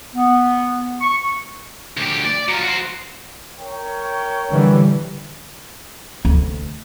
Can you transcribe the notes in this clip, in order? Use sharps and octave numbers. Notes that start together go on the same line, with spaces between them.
B3
C#6
D2 G4
D5
F#3 F4
F#4 C5
A#4 C#5 G5
D3 E3 G3
D2